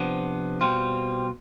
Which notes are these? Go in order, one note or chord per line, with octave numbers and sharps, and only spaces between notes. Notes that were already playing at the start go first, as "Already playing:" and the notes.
Already playing: C3 F3 B3 D4
B2 G3 C4 F4